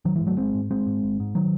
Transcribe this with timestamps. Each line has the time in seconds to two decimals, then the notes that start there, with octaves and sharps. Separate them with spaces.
0.05 G#1 D#3 F#3
0.16 E3 G#3
0.21 G#2
0.27 F#3 A3
0.37 G#1 G#3 C4
0.54 G#2
0.71 G#1 G#3 C4
0.86 G#2
1.03 G#1
1.20 G#2
1.35 D#3 F#3